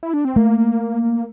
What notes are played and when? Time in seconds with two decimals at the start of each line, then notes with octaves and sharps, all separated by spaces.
0.03 E4
0.14 D4
0.25 C4
0.36 A3 A#3